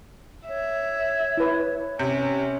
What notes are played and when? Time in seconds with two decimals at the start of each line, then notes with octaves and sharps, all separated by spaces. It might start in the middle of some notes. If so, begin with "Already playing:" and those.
0.48 C#5 E5
1.37 E4 B4
1.99 C3 C#4